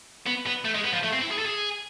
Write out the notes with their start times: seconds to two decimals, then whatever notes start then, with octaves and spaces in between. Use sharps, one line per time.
0.26 B3
0.46 B3
0.65 A3
0.74 G#3
0.84 B3
0.93 F3
1.03 A3
1.13 C4
1.21 E4
1.31 G#4
1.39 A4
1.46 G#4